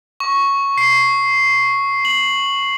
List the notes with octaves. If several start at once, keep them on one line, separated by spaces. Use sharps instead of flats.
C#6
C7
F#7